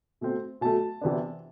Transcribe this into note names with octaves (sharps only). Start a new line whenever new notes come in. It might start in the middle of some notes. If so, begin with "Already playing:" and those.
B2 A3 C4
B2 F#3 A3 A5
C3 E3 B3 D4